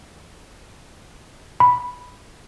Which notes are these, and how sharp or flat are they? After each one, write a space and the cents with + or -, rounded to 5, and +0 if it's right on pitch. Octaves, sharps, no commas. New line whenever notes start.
B5 -5